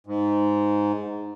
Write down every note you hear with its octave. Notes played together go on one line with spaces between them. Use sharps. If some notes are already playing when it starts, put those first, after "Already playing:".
G#2